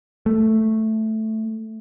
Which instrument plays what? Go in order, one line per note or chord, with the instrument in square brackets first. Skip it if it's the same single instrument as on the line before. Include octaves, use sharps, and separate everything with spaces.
[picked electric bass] A3